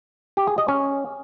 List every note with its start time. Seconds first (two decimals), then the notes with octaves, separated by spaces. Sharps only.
0.37 G4
0.47 G#4
0.58 D#5
0.68 C#4